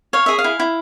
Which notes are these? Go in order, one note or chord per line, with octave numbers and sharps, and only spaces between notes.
C#5 F5
G#4 E5
F5
E4
E4